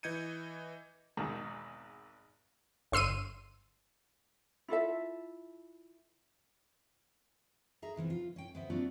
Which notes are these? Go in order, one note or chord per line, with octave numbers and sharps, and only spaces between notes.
E3 D#5 G6 G#6 C#7 D#7
G#1 E2 G#2 B2 D#3
G1 C6 E6 C7 D#7
E4 F4 A4 E5
G#4 E5 A#5
C3 E3 F3 B3
F4
C#4 G5
D2 B3 C5 E5
F#3 A#3 C4 D4 F4 F#4